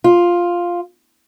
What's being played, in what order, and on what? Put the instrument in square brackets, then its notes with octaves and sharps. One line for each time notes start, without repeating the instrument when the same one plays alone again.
[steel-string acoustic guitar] F4